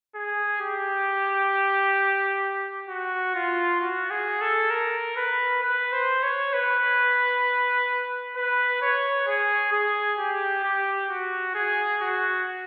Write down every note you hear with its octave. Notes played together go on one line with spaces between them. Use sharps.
G#4
G4
F#4
F4
F#4
G#4
A4
A#4
B4
B4
C5
C#5
B4
B4
C#5
G#4
G#4
G4
G4
F#4
G#4
F#4